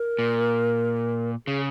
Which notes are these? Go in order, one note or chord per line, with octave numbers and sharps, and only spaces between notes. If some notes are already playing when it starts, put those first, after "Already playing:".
Already playing: A#4
A#2
C#3 G#4